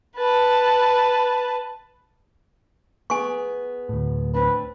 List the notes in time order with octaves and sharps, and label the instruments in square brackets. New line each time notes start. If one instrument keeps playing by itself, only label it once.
[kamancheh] B4 A5
[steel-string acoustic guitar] B3 G#4 [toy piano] G#5 C#6
[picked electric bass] D2 A2
[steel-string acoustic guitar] C4 D4 [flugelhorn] B4